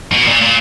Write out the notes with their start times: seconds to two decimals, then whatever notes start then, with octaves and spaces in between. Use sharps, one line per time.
0.12 B2
0.27 A#2
0.42 A#2